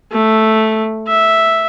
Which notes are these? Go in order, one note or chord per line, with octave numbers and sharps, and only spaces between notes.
A3
E5